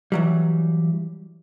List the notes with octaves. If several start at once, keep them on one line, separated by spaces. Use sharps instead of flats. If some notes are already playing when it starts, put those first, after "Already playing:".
E3 F#3 G3